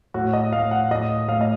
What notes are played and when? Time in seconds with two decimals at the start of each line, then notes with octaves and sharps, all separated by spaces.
0.14 A2 F#4
0.33 D#5
0.53 A2 F5
0.71 F#5
0.91 A2 D#5
1.28 A2 F5
1.41 D#5